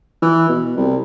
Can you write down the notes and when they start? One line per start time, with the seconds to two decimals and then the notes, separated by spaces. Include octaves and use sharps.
0.22 E3
0.49 B2
0.77 C2